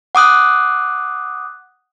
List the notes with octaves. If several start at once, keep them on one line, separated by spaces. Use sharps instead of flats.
F#5 D6 D#6 F#6